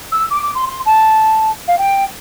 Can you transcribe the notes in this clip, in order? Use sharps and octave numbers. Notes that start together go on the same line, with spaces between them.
E6
D6
D6
C6
C6
A5
F5
G5